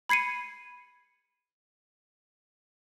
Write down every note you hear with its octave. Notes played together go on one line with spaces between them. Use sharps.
B5 G#6 C7 C#7 D#7